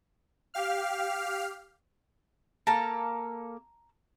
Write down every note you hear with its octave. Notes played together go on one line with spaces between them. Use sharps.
G4 F5 F6
A#3 A4 F5 A5 A#5